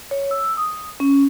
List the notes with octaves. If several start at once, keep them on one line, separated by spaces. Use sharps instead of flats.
C#5
E6
D#6
C#4